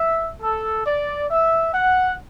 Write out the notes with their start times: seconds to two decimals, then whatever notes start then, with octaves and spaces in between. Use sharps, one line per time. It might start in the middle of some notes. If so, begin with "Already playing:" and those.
Already playing: E5
0.41 A4
0.87 D5
1.30 E5
1.73 F#5